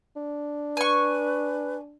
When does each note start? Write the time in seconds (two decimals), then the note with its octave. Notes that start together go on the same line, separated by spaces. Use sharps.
0.16 D4
0.77 B4 G#5 C#6